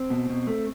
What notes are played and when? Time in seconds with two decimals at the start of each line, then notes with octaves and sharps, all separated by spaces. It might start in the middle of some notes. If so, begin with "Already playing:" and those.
Already playing: C4
0.10 B2
0.29 B2
0.47 A3